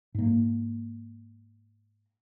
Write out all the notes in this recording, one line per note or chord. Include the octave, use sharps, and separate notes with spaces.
G#2 A#3